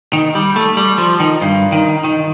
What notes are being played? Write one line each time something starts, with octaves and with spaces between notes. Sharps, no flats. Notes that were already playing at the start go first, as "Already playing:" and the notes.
D#3
G3
A3
G3
F3
D#3
G2
D#3
D#3